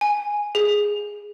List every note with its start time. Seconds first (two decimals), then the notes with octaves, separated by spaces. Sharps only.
0.01 G#5
0.55 G#4